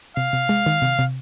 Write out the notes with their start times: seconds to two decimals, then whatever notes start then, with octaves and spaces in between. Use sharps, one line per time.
0.16 C3 F5
0.33 C3
0.49 G#3
0.66 D#3
0.82 C3
0.99 C3